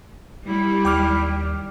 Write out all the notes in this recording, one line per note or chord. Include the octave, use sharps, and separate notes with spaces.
G3 E4
D#2 G5 D6 F6